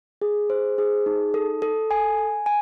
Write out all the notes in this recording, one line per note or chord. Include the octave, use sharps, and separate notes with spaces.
G#4
C5
G#4
D#4
A4
A4
G#5
G#5
G#5